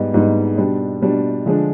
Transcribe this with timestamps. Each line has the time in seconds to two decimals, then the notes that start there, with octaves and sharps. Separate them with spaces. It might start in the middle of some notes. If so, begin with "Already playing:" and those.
Already playing: G#2 G3 B3 D#4
0.14 G#2 G3 B3 D#4
0.58 B2 G3 D4
1.01 B2 G3 D4
1.46 D3 F3 G#3 D4